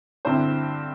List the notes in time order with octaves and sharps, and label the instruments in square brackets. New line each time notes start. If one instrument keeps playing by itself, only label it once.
[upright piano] G2 D3 C4 E4 C5